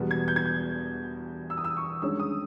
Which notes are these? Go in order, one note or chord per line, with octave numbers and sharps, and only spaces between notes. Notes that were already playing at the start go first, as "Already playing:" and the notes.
Already playing: E2 B2 G3 B3
G#6
G6
G#6
G6
E6
D#6
E6
C#6
G2 D#3 G#3 C#4 E6
D#6